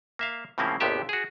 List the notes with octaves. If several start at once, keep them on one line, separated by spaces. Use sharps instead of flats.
A#3 E5 F5
A2 C#3 F3 A#3 C4 E4
G#1 D#2 C3 B3 G4 E5
F#4 G#4